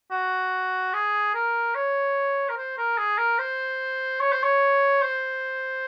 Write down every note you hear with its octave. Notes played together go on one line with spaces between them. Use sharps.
F#4
G#4
A#4
C#5
A#4
C5
A#4
G#4
A#4
C5
C#5
C5
C#5
C5